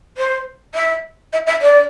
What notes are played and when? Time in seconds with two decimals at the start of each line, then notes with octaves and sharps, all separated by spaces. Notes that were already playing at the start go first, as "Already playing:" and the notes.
0.17 C5
0.74 E5
1.33 E5
1.46 E5
1.61 D5